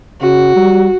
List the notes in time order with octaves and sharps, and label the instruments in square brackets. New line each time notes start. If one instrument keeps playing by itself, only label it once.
[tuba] C#3 [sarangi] F#4
[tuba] G3